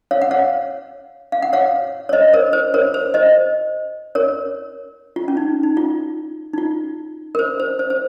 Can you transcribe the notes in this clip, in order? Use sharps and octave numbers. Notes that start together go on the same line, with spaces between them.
C#5 F5
F#5
C#5 F5
F5
F#5
C#5 F5
C#5
C5 D#5
A#4 C#5
C5
A#4 C#5
C5
C5 D#5
A#4 C#5
F4
C#4
D#4
D#4
F4
D#4
F4
A#4
C5
C5
C5
C5